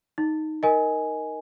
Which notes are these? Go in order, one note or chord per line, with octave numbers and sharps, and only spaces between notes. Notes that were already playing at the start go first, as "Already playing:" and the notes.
D#4
A#4 D#5 G#5